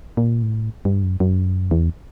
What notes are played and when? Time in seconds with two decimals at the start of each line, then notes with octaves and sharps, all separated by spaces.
0.17 A#2
0.43 A2
0.85 G2
1.03 F#2
1.20 F#2
1.71 E2